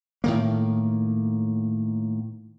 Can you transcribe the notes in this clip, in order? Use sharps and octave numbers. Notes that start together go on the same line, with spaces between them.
A2 D#3 A#3